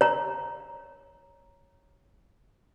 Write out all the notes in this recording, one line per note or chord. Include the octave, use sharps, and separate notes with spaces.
C#5 A#5